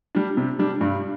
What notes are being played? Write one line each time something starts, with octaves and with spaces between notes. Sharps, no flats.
G3 D4
C3
G3 D4
G2